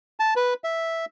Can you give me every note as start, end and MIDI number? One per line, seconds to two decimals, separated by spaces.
0.20 0.34 81
0.36 0.54 71
0.64 1.05 76